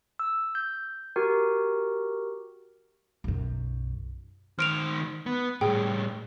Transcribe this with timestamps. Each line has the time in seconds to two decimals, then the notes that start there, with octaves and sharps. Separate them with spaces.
0.19 E6
0.55 G6
1.16 F#4 G4 A#4
3.24 B1 F#2
4.59 D#3 C5 F6 D7 F7
5.26 B3
5.61 A2 G3 G#4 G5